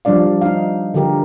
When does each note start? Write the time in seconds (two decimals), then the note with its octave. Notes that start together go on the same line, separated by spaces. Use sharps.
0.05 F3 G3 D4 D5 F5
0.42 D#4 F5
0.94 D3 F3 G4 A#4